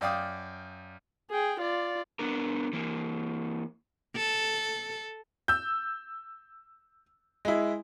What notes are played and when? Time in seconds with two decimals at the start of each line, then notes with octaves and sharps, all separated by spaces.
0.01 F#2 D5 F5 G5 D#6
1.31 G#4 G5
1.60 F4 D5
2.19 B3 D4 A#4
2.73 E3 A#3
4.16 A4
5.48 E6 G6
7.45 G#3 E4